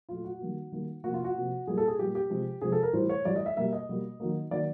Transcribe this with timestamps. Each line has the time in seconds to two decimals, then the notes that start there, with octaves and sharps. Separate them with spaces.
0.09 A#2 F#3 A3 F4
0.25 F#4
0.41 D#3 G3 A#3
0.72 D#3 G3 A#3
1.04 C3 F3 A#3 F#4
1.14 F4
1.24 F#4
1.35 C3 F3 A#3
1.67 A#2 G3 A#3 G#4
1.78 A4
1.88 G#4
1.98 A#2 G3 A#3 G4
2.15 G4
2.30 C3 F3 G#3
2.61 C3 F3 G#3 G#4
2.72 A4
2.83 A#4
2.93 A2 E3 G3 C5
3.09 C#5
3.25 A2 E3 G3 D5
3.36 D#5
3.46 E5
3.57 B2 G3 A#3 E5
3.73 D#5
3.89 B2 G3 A#3
4.20 D#3 F#3 A#3
4.51 D#3 F#3 A#3 D5